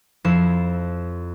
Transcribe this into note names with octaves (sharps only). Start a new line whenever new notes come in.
F2 F3 E4 C7 E7